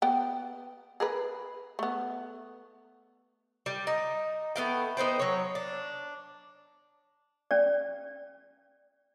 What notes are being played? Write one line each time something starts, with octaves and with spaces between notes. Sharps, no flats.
B3 G5
G#4 A#4 B4
A3 B3
G3
D#4
A3 B3 F5 G5
B3 D#4 C5 G5
F#3 C#5
D4
C#4 D5